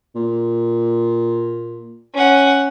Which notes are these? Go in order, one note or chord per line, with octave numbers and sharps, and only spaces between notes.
A#2
C#4 F#5